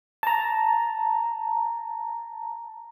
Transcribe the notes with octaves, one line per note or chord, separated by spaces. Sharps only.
A5 A#5